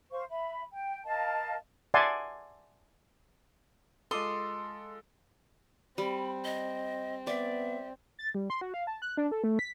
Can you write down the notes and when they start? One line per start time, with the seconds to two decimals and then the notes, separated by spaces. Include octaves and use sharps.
0.12 C5 F5 C#6
0.29 E5 B5
0.71 G5
1.05 A#4 D#5 F5 A5
1.94 D5 E5 F#5 G#5 A5 C6
4.11 G#3 F4 A4 D#5 C6 D6 D#6
5.98 G3 C4 B5
6.44 D#5
7.27 B3 D5 E5
8.19 A6
8.35 G3
8.50 C6
8.61 F#4
8.74 F5
8.87 A5
9.02 F#6
9.17 D4
9.31 A4
9.44 A3
9.59 B6